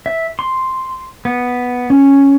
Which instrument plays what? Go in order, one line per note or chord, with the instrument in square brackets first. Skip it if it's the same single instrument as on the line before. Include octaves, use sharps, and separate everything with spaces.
[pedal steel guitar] E5
C6
B3
C#4